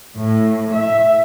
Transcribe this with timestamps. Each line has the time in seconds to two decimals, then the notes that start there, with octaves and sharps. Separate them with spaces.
0.16 A2
0.74 E5